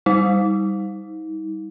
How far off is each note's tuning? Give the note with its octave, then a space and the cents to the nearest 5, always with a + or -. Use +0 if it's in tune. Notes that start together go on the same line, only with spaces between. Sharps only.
G3 +0 D#4 +40